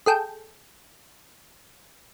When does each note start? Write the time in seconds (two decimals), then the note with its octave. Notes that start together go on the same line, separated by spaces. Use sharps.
0.06 G#4 A4 G5